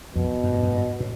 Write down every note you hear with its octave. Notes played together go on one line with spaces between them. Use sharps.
F2 B2
F#2
G2
F#2
G2
A2